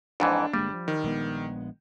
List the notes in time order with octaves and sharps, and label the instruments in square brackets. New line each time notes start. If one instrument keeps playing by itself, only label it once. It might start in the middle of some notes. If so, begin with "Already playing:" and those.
[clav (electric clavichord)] F2 G#2 E3 [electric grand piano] D4
[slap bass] G1 G#3 A#3 [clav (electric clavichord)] G3
[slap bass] F3
[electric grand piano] D#3
[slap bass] A#1 G#3 B3